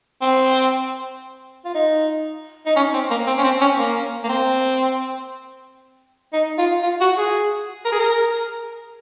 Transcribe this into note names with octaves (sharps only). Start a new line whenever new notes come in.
C4
F4
D#4
D#4
C#4
C4
A#3
C4
C#4
C4
C#4
A#3
A#3
C4
D#4
F4
F4
F#4
G#4
A#4
G#4
A#4